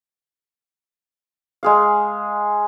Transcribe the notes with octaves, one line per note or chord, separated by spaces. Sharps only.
G#3 G#4 F5